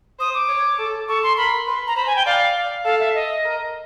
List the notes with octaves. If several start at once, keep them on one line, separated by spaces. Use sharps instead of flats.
C5 D#6
D6
C#5
A4
A4 C#6
C6
A#4 B5
B4 C6
A#5
C5 B5
G#5
G5
D5 F5
D5
A4 F5
E5
D#5
A#4